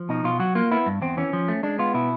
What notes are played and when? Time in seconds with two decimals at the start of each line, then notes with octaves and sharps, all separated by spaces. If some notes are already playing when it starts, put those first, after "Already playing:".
Already playing: F3
0.09 B2 D#4
0.24 B2 F4
0.40 F#3 F#4
0.55 A#3 F4
0.71 B3 E4
0.86 G2
1.02 E2 C4
1.17 E3 C#4
1.33 F3
1.48 A3
1.63 G#3 D4
1.79 B3 F4
1.94 B2 E4